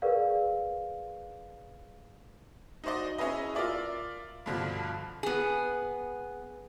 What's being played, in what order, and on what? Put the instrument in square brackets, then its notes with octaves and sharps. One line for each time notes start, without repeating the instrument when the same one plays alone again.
[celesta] G#4 A#4 B4 D5 F5
[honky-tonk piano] D#4 F#4 C5 D5 D#5
C#4 E4 G#4 B4 D#5
F4 A#4 D5 E5
G2 B2 D3 F3 G3
[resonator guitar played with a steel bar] B3 G#4